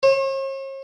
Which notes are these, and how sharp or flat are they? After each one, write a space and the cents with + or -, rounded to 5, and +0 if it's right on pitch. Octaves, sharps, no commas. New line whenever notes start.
C#5 -45